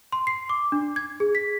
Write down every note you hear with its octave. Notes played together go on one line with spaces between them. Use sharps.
C6
C7
D6
D4
G#6
G#4
B6